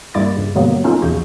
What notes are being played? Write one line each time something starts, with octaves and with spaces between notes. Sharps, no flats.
G2 G3 A#3 E4 D6 A6
G2 C#3
B2 D3 F#3 G3 A#3 B3
B3 C#4 D#4 F4 A4
A#1 E2 C#3 F#4 D#5 G6